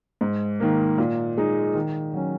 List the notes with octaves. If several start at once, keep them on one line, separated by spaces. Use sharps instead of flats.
G#2
D#3 A#3
A#2
G#3 D#4
D#3
F#3 C#4